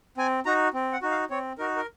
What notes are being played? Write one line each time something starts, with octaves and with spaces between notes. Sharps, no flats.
C4 G#5
D#4 F#4 A#5
C4
F#5
D#4 F#4
F5
C4 C#5
D#4 F#4 A#4
A#4